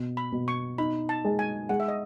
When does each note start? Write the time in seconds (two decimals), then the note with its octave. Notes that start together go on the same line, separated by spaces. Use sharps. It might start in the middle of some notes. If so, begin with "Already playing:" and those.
Already playing: B2
0.17 B5
0.32 B2
0.48 C#6
0.78 D#4 B5
1.09 A5
1.25 G#3
1.39 G#5
1.69 G#3 F#5
1.80 E5
1.88 D#5